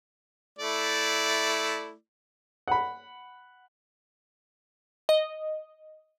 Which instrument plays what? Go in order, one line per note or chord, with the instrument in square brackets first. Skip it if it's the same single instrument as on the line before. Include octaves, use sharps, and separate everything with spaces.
[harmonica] A3 E4 D5
[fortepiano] F#5 B5
[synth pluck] D#5